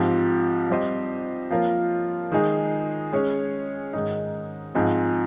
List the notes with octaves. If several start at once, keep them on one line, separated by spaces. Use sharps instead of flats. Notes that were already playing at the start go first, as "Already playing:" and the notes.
Already playing: G#2 F3 C4 G4
G3 C4 G4 C5 D#5
F3 A#3 F4 A#4 C#5
D#3 G#3 D#4 G#4
G#3 C#4 G#4 C#5
G#2 D#3 G#3 D#4
G#2 F3 C4 D#4 G#4